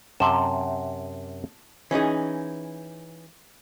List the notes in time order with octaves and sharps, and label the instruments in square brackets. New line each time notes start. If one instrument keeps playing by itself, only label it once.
[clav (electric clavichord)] F#2 C3 [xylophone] A5 C6
[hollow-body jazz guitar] E3 C#4 D#4 G#4